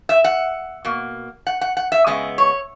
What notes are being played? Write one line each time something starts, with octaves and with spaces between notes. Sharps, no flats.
E5
F#5
B2 A#3
F#5
F#5
F#5
E5
C#3 G#3 B3 D#5
C#5